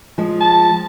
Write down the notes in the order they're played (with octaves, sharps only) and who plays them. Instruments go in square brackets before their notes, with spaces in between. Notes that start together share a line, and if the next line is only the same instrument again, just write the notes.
[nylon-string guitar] F3 G#3
[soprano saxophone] A5